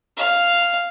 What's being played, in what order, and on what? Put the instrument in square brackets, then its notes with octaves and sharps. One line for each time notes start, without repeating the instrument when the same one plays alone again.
[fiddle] F5